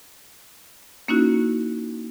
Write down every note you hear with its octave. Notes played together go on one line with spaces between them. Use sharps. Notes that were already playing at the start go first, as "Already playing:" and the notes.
A#3 C#4 D#4 E4 F#4